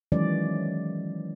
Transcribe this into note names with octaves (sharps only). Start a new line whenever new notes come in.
D#3 E3 F#3 G#3 C#4 D5